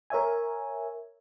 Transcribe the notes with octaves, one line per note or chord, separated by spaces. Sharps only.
A#4 C#5 E5 G#5